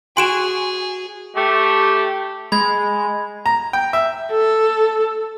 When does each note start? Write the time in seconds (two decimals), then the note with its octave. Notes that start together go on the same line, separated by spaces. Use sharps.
0.17 F#4 G#4 G#5 C6 D7 E7
1.36 A3 G4
2.52 G#3 B5 G#6
3.46 A#5
3.73 G5
3.93 E5
4.31 A4